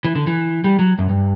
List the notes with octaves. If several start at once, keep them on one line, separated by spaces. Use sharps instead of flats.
E3
D3
E3
G3
F#3
F#2
G2